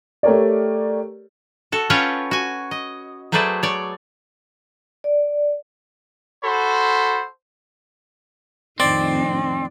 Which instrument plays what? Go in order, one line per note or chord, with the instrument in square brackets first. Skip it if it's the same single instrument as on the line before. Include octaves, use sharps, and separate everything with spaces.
[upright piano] A3 G4 A#4 C#5 D5
[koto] F#4 A4
C#4 F4 B4 C#5 F#5 G5
F#4 G#5
D#5
F#3 A3 G#4 B4 C5 D5
C#5 D5
[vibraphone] D5
[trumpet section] F#4 A4 C5 B5
[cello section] F2 A2 D4 [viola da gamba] D#3 [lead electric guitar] C4 [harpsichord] D5